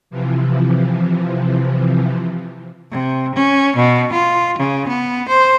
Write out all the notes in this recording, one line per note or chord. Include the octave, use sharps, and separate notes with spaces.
C3 E3 F3
C3
C#4
B2
F4
C#3
B3
C5